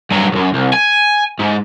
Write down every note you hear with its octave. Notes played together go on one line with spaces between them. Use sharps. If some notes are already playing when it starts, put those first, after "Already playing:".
G2 F#3
B1 F#2
C2
G#5
G#2